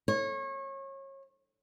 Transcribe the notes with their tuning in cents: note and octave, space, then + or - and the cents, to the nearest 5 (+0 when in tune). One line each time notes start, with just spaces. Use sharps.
C#5 -30